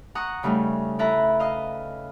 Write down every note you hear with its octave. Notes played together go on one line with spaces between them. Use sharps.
F#5 A#5 C#6 D#6
C#3 G3 A3 D#4
E4 A4 B4 E5 A#5
D#5 F5